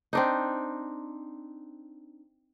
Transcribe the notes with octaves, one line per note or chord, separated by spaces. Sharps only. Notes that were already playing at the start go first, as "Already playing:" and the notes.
C4 D4 D#4